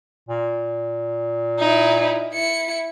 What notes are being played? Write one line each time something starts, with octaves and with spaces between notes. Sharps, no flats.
A#2
D#4 E4
E4 C#7